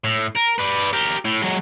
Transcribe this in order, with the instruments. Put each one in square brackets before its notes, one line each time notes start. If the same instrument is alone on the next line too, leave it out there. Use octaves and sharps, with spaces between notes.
[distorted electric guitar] A2
A#4
B4 D5
G4 A#4
A2
F#3 G#3